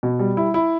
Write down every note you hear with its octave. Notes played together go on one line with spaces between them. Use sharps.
B2
G3
E4
E4